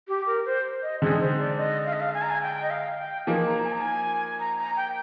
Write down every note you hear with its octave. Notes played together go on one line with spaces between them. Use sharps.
G4
A#4
C5
D#5
D3 G#3 C4 D#4 G#4
C5
D5
D#5
F5
D#5
F5
G#5
A#5
G#5
G5
D#5
F5
G5
F3 A#3 D#4 G#5
A#5
G#5
A#5
G#5
A#5
A#5
G5